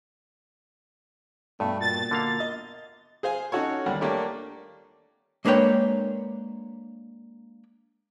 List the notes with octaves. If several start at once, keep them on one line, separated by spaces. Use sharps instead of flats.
G2 B2 A3
A#2 A6
D3 A#3 F5
D#5
G#4 C5 F5 G#5
C#4 D#4 F#4 A4 C#5
D#2 D3 G3 D4 F#5
A3 A#3 D4 G4 C#5 D5
G#3 A#3 D4 B4 C#5 G5